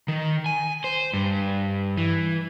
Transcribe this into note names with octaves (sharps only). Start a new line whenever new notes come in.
D#3
G#5
C5
G2
E3